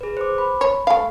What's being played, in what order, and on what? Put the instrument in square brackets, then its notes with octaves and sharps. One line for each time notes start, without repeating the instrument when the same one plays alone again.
[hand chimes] G#4 B4
C5 D6
B5
[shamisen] C#5
A3 F5